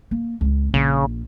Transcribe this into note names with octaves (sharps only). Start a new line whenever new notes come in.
A#3
C#2 C4
A#1 C#3